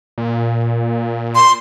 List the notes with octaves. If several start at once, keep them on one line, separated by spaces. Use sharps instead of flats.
A#2
C6